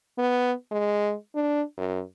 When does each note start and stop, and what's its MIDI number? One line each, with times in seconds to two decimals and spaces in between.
0.18 0.53 59
0.71 1.14 56
1.35 1.62 62
1.78 2.02 42